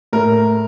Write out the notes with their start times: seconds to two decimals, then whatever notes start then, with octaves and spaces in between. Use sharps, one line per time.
0.13 A2 A3 A#4